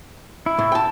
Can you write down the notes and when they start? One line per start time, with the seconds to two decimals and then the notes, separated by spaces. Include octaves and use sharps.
0.46 E4
0.59 A2
0.72 G5 A5